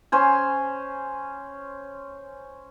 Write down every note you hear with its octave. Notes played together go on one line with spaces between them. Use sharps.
C#4 C5 G#5